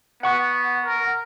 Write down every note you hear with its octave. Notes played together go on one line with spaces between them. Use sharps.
B3 F#5 C#6
A#4